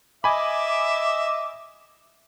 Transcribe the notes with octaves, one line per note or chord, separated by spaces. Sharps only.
D#5 E5 G#5 B5 D6